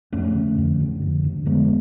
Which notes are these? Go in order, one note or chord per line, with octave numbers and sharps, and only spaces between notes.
F2 A3 C#4
D3
F2
D3
F2
D3
F2 G#3 B3